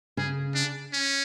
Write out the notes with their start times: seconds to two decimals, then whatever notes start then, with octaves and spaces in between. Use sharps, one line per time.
0.17 C#3 G#4
0.55 D4
0.93 C#4